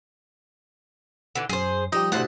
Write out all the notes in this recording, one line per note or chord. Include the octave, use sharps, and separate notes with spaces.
D3 E3
F#2 G#4 C5
F3 G3 D#4 G4 D#5
D2 A2 C3 C5 F#5 A5